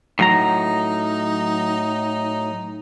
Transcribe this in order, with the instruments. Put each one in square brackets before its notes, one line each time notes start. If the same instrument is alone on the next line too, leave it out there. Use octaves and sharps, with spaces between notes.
[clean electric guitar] A2 F#3 A#5 [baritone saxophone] D#4